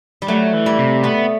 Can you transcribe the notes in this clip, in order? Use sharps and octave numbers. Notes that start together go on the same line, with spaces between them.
G3
F#3 A3
E3
G3
C3
A3 B3